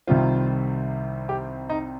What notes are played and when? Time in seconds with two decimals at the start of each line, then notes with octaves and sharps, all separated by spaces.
0.07 C2 C3 D#3 G3 C4 F4
1.29 G4
1.69 D#4